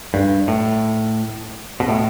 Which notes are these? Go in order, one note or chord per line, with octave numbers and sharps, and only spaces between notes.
G2
A2
B2
A2